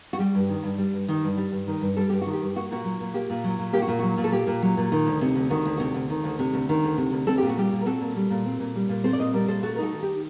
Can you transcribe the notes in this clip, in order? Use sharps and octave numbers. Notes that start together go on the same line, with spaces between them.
F#4
G3 G4
G2
D#3
G2
G3
G2
D#3
G2
G3
G2
D#3
G2
G3 A4
G2 G4
F#4
D#3
G4
G2
A#3 F#4
A#2 F#4
F#3
A#2
A#3 G4
A#2
F#3
A#2
A#3 G4
F#4
A#2
F#3 F#4
A#2
A4
A#3 G4
A#2
F#3
A#2
D#3
D2
C3
D2
D#3 F#4
D2
C3 F#4
D2
D#3
D2
C3
D2
D#3
D2
C3
D2
C4 A4
A#2 G4
F#4
G3 G4
A#2
A#4
C4 F#4 A4
A#2
G3
A#2
C4
A#2
G3
A#2
C4 A4 C5
D5
A#2 C5 D#5
G3 A#4 D5
A#2 A4 C5
A3 F#4 A4
A#4
D#4 F#4 A4
D#3
G4